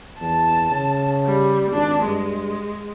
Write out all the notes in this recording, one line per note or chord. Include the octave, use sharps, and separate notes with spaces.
E2 A5
C#3
G3
G#1 D4
G2 G#3